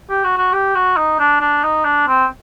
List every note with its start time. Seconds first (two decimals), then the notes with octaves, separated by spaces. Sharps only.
0.09 G4
0.24 F#4
0.38 F#4
0.53 G4
0.75 F#4
0.97 D#4
1.19 D4
1.40 D4
1.63 D#4
1.84 D4
2.07 C4